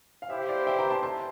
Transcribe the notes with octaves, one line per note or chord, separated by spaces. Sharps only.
F5
E4 G4 C5 E5
D5 F5
E5 G5
G5 A#5
A5 C6
A5 C6